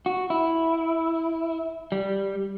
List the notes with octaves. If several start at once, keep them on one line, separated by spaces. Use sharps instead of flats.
F#4
E4
G3